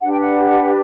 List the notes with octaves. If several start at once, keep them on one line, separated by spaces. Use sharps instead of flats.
D4 G4 B4 F#5
G5
F#5